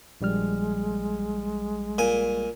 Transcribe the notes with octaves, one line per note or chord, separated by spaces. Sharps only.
A#1 G3 G#3 F6
A#2 G#5